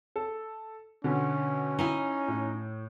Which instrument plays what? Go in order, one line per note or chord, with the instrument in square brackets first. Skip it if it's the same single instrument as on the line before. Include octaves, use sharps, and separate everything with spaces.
[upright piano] A4
[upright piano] B2 D3 [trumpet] C#4
[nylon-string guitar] D#4 E4 G#5
[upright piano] A2